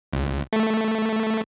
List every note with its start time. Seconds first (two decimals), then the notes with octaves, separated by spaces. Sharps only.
0.13 C#2
0.53 A3